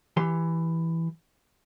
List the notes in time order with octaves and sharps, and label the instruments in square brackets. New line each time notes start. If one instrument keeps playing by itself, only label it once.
[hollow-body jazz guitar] E3 G4 C6